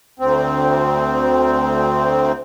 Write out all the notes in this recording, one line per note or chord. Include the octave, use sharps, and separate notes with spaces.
D2 C4